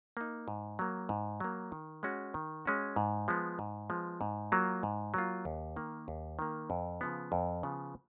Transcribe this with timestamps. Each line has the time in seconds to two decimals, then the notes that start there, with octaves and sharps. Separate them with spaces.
0.17 A#3 D#4
0.48 G#2
0.79 F#3 A#3
1.09 G#2
1.40 F#3 A#3
1.72 D#3
2.03 G#3 C#4 F#4
2.34 D#3
2.65 G#3 C#4 F#4
2.96 G#2
3.28 F3 G#3 B3
3.59 G#2
3.90 F3 G#3 B3
4.21 G#2
4.52 F#3 A#3 F4
4.83 G#2
5.14 F#3 A#3 F4
5.45 D#2
5.76 D#3 A#3
6.08 D#2
6.39 D#3 A#3
6.70 F2
7.01 C#3 F3 B3
7.32 F2
7.63 C#3 F3 B3